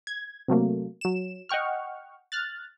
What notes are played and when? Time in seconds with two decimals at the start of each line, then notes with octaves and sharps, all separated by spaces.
0.07 G#6
0.48 C3 F#3 A3 A#3
1.01 F#3 E7
1.49 D#5 F#5 G5 C#6 F6
2.32 F6 F#6 A6